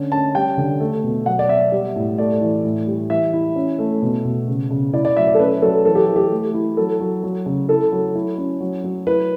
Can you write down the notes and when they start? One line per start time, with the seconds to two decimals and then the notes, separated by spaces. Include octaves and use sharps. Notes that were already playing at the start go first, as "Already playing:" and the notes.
Already playing: D3 C#4
0.12 C#4 A5
0.35 G3 G5
0.57 D3
0.80 A3
1.04 B2
1.26 F#3 F#5
1.39 D5
1.49 B3 E5
1.72 G3
1.96 A2
2.18 A3 D5
2.41 E3
2.64 A2
2.87 G3
3.10 E3 E5
3.33 E4
3.56 C#4
3.79 A3
4.02 B2
4.25 B2
4.48 C#3
4.71 C#3
4.93 E4 D5
5.05 D5
5.17 F#3 E5
5.28 D5
5.34 A4
5.39 C#4 B4
5.62 F#3 A4
5.85 E3 A4
5.95 G4
6.08 E3
6.16 G4
6.31 A3
6.54 E4
6.77 F#3 A4
7.00 F#3
7.23 F#3
7.46 C#3
7.69 E4 A4
7.92 F#3
8.15 E4
8.38 C#4
8.60 F#3
8.84 F#3
9.07 E4 B4